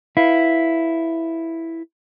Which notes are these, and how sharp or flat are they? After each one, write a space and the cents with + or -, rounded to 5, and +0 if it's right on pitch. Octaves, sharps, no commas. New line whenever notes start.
E4 +0 B4 +0 F5 +0